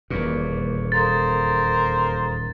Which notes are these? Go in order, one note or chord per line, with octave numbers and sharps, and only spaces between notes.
D#1 E2 A#2 A#4 B4 C#6
A4 A#4 C5 F5 C6 D#6 A6